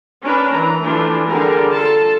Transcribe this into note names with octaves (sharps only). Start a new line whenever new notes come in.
C#4 D4 A#4 B4
E3 A#5
E3 F3 A3 D4 F4
D3 G3 G4 G#4 A#4
F4 A4 A5